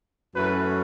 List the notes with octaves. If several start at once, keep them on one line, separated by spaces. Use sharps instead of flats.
F#2 E3 A3 C#4 B4